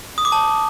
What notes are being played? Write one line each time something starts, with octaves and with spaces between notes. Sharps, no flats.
D#6
D6
A5